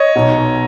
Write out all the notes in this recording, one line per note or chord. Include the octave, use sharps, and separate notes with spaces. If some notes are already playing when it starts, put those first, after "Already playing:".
Already playing: C#5 D#5
B1 B2